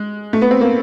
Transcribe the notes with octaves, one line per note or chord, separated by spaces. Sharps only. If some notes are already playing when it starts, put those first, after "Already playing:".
Already playing: G#3
A3
B3
C4
A#3